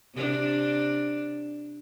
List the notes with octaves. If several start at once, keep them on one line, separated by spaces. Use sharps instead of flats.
C3 D4